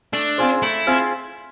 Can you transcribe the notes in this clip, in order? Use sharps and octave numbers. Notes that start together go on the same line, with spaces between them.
A3 D4
C4 F4 G#4 C5
A3 E4
C4 F4 G#4 C5